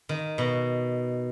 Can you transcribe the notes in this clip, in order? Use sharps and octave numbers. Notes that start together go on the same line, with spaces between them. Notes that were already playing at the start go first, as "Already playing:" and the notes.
D#3
B2